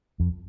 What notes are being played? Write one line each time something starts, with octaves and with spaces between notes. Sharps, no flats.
F2